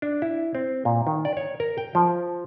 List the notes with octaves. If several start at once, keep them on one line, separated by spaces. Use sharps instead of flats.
D4
E4
C4
A#2
D#3
D5
C#5
A#4
G5
F3